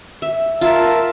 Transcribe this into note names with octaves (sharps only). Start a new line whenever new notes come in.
E5
F4 A#4 E5 A5